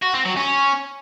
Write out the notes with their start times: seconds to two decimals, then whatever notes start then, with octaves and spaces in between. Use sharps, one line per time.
0.03 F#4
0.14 C4
0.25 F#3
0.37 C#4